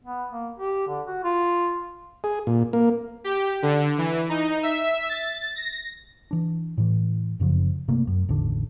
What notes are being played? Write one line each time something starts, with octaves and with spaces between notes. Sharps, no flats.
B3
A#3
G4
D3
F#4
F4
G#4
A#2
A#3
G4
D3
E3
D#4
E5
A6
A#6
E3 D4
A2 E3
F1 F#2 C#3 F3
G1 C3 A3 A#3
F#2
A1 E2 D3 D4